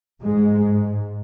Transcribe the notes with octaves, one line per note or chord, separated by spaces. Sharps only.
G#2 G#3